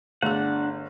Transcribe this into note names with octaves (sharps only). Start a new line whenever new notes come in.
G1 A3 D4 G#4 F#5